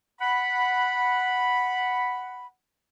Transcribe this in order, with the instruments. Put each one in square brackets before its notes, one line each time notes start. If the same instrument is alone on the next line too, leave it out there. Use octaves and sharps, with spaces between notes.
[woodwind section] F#5 B5